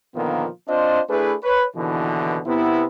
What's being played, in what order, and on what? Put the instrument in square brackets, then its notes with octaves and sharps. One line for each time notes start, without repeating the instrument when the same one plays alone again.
[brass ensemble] A#2 D3 D#3 F3 A#3 B3
C4 D4 F4 C5 D#5
A3 D4 E4 G#4 B4
B4 C#5
D#2 B2 D3 E3
C3 B3 E4